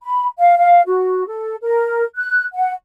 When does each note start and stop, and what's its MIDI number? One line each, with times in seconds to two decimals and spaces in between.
0.04 0.25 83
0.39 0.55 77
0.58 0.82 77
0.86 1.25 66
1.28 1.55 69
1.63 2.04 70
2.16 2.44 90
2.54 2.72 78